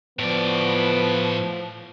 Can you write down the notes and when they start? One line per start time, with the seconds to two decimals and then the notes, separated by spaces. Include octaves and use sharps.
0.19 A2 F3 B3 D5